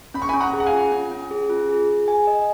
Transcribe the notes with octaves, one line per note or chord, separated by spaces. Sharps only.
C#4 B5
C#6
G#5 B5
C#4
F#5 A#5
G#4
F#5
F5 G#5
F4
C#4
C#4
G#4
F4
G#4
G#4
G#5
D#5